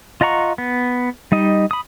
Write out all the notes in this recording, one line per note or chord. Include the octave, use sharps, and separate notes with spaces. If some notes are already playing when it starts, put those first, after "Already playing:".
F4 D#5 F#5 A#5 C#6
B3
G3 D#4 D#5
B5 D#6